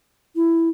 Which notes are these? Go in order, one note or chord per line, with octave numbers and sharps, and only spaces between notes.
E4